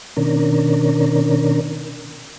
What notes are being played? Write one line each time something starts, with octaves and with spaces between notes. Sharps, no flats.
B2 D#3 C#4 D4 A#4